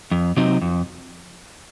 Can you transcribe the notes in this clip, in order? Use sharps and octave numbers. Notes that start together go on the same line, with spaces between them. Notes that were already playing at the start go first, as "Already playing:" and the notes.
F2
C3 F#3 C4 D#4
F2